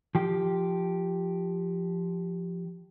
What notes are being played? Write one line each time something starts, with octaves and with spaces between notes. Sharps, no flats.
F3 G4